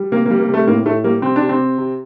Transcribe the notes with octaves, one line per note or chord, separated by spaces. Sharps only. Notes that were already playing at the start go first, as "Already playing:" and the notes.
Already playing: G3
C3 A#3
A#3
G3
A#3
C3
A3
A2 A#3
A2 A3
G3 A#3
C3 C4
D4
C3
C4
C3
C3